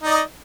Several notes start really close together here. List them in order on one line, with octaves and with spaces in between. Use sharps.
D#4 D5 D#5